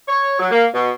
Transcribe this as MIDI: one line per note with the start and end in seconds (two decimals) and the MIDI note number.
0.08 0.39 73
0.39 0.48 54
0.51 0.66 58
0.74 0.92 47